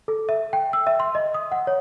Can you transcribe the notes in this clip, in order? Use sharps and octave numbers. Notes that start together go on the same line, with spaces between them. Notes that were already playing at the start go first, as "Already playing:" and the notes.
A4
E5
G5
E6
E5
C6
D#5
D#6
F#5
C#5